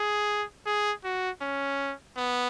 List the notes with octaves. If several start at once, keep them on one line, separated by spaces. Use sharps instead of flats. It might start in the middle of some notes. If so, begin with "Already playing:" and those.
Already playing: G#4
G#4
F#4
C#4
B3